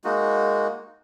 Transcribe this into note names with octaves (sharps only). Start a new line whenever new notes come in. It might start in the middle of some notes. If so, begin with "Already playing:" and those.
G#3 A#3 D#4 F#4